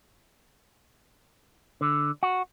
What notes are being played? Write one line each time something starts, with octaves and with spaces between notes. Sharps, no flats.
D3
F#4